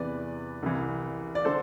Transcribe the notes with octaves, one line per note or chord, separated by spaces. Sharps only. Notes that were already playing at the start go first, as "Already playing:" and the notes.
Already playing: E2 C3 E3 B4 D5
C2 C3 E3
D5
D3 A4 C5